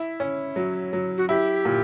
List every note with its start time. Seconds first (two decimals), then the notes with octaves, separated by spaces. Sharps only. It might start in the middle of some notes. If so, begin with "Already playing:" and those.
Already playing: E4
0.20 C#4
0.56 F#3
0.93 F#3
1.18 F#4
1.29 E4 G4
1.65 A#2